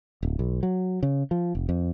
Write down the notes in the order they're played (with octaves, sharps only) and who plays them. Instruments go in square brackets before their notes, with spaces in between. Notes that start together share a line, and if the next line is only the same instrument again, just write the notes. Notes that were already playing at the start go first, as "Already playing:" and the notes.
[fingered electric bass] D1
B1
F#3
C#3
F3
F1
F2